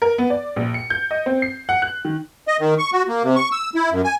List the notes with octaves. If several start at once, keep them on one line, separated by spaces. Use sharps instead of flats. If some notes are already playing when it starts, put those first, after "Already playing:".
A#4
B3
D5
A#1
C#7
G6
D#5
C4
C7
F#5
F#6
D#3
D#5
D#3
C#6
F#4
A#3
C3
C#6
E6
E4
F#2
G#5